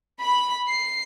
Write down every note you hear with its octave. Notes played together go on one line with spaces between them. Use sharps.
B5
C7